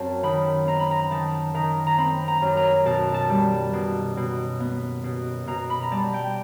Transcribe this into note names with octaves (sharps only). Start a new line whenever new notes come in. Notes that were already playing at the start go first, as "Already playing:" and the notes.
Already playing: F#2 C4 A5
D#3 B5
C4 A#5
B5
A#5
D#3 A5
D#3 A#5
A#5
C4 B5
A#5
F#2
A#5
B2 A5
A5
G3
B2
B2
B3
B2
B2 A#5
B5
A#5
G3 A5
G5